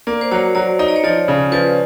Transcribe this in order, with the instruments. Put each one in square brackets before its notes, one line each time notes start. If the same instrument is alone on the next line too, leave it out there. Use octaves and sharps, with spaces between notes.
[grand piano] A#3 [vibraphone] D5
[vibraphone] C5
[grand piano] F#3 [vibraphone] C#5
[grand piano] F#3 [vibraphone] D5
[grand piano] D#4 [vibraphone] D#5
[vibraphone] D5
C#5
[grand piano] F3 [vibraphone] D5
[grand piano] C#3
[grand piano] F3 [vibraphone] B4